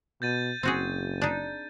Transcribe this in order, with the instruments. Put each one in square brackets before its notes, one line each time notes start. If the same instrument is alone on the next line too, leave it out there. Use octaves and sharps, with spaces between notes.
[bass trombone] B2 [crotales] G6 A6 D#7
[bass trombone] F#1 [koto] C4 F#4 G#4
[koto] D4 D#4